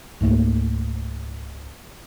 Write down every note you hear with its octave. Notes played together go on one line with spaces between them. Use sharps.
C#2 G#2 A3 A#3